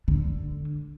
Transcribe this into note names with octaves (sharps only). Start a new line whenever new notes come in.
D3